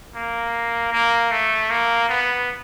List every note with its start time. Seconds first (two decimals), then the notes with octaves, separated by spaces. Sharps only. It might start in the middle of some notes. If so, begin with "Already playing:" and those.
0.15 A#3
0.93 A#3
1.31 A3
1.70 A#3
2.09 B3